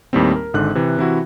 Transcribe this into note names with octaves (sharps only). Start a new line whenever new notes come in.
D#2 A2 G3 A#3 C4
A#4
G#1 G#2 D3 F#6
C3 E3
C3 E3 E4 F#4